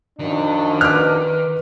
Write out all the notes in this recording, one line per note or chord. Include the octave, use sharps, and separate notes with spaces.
F#2 D#3 F3 D4
B4 D6 F6